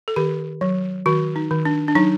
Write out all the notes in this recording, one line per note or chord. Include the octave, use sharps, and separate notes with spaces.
A4
D#3 G4
F#3
D#3 F#4
D#4
D#3
D4
D4
F#3 D#4